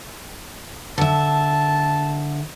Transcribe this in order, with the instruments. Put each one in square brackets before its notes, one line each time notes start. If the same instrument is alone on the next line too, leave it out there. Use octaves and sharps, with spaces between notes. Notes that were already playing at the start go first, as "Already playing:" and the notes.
[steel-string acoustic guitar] D3 E5 [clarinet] A5